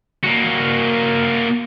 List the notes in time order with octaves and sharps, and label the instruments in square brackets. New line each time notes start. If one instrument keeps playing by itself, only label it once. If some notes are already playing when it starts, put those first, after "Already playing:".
[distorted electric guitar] A#3 F#4